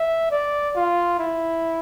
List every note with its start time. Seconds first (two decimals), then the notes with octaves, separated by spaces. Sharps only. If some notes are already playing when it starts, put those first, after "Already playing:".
Already playing: E5
0.31 D5
0.75 F4
1.19 E4